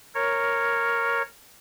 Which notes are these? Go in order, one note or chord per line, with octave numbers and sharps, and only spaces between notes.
A#4 C#5